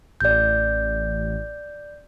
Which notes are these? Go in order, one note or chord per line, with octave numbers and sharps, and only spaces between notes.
A1 D5 G6